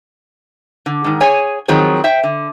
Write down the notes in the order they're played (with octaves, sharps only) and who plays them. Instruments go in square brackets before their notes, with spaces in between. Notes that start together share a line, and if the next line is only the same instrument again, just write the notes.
[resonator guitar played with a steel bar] D3
G#2 D#3
G#4 C#5 G#5
D#3 F3 F#3 C4 G#4
C5 E5 G5
D3